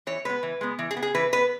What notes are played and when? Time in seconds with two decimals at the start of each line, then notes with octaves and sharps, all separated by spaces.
0.07 E3 C#5
0.25 G#3 B3 B4
0.43 E3
0.61 G#3 B3
0.79 E3
0.91 G#4
0.97 B3
1.02 G#4
1.15 E3 B4
1.32 B3 B4